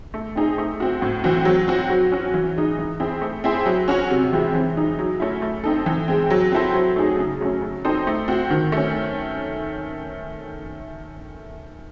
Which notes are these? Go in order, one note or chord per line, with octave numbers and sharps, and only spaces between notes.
A3
C4 D#4 G#4
A3
C4 F#4
A2
E3 C4 F#4
F#3
C4 F#4
F#3
C#4 F#4
E3
G#3 D#4
E3
C4 E4 G#4
A3
C4 E4 G#4 C5
F#3
C#4 F#4 C#5
C3
E3 G#3 C4 E4
E3
G#3 D#4
F#3
A3 C#4 E4
A3
C4 D#4 A4
E3
G#3 C4
F#3
C4 E4 A4 C5
F#3
A3 D#4 G#4
C#3
F#3 A3 C#4
F#3
C4 D#4 A4 C5
A3
C4 F#4
D#3
A3 C#4